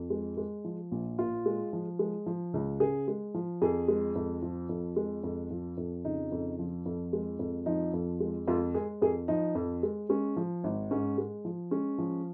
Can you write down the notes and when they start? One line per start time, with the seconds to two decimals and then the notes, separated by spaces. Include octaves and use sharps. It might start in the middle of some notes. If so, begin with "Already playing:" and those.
Already playing: F2
0.10 G#3
0.37 G#3
0.64 F3
0.92 A#1
1.19 A#2 F4
1.46 G#3
1.73 F3
1.99 G#3
2.26 F3
2.54 C#2
2.80 C#3 G#4
3.08 G#3
3.34 F3
3.62 F2 G#4
3.88 G#3
4.15 F2
4.42 F3
4.69 F2
4.96 G#3
5.23 F2
5.51 F3
5.77 F2
6.05 C#3 D#4
6.32 F2
6.59 F3
6.86 F2
7.13 G#3
7.39 F2
7.66 F3 D#4
7.93 F2
8.20 G#3
8.47 F2 F4
8.74 G#3 G#4
9.02 F2 G#4
9.28 F3 D#4
9.55 F2
9.83 G#3
10.09 G#3 C#4
10.37 F3
10.64 G#1
10.91 G#2 C#4
11.18 G#3
11.45 F3
11.71 G#3 C#4
11.98 F3